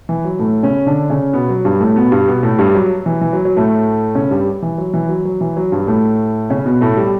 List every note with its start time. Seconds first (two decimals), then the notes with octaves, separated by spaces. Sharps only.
0.09 E3
0.25 F#3
0.39 A2 A3
0.63 C#3 C#4
0.86 D3 D4
1.10 C#3 C#4
1.33 B2 B3
1.49 F#3
1.64 G2 G3
1.80 A2 A3
1.96 B2 B3
2.11 G2 G3
2.28 B2 B3
2.43 A2 A3
2.58 G2 G3
2.75 F#3
3.06 E3
3.21 E3
3.33 F#3
3.45 F#3
3.56 A2 A3
4.15 C#3 C#4
4.31 G2 G3
4.62 E3
4.78 F#3
4.94 E3
5.09 F#3
5.25 F#3
5.41 E3
5.57 F#3
5.72 G2 G3
5.87 A2 A3
6.50 C#3 C#4
6.66 B2 B3
6.81 A2 A3
6.97 G3